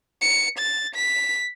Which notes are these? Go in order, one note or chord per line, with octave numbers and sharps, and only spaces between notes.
C#7
A6
B6